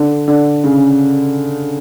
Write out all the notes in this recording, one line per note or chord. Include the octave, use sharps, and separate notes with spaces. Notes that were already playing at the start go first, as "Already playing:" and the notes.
Already playing: D3
D3
C#3